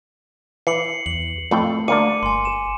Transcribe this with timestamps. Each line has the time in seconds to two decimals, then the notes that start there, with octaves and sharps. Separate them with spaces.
0.67 E3 C7 C#7 F#7
1.06 E2 F#7
1.51 F2 A2 A3 G5
1.88 D2 A#3 D4 D6 C#7 D#7
2.23 G1 G#5 C6
2.45 E7